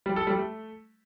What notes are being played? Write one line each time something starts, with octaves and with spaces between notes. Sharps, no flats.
G3
A4
G3
A3